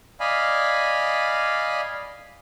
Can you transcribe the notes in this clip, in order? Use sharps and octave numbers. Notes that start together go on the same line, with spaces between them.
D5 D#5 F5 G#5 B5